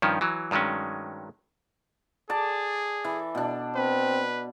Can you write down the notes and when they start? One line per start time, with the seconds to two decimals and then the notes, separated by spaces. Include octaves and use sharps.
0.02 G2 D#3 F3 C#4
0.21 E3 F#3
0.51 G2 D#3 F#3 G#3 C#4
2.30 G#4 D5 A5
3.05 E3
3.35 B2 D4
3.76 C4 B4